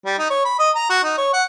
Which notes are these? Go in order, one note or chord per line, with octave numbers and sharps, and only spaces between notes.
G3
D#4
C#5
B5
D#5
A#5
F#4
D#4
C#5
F#5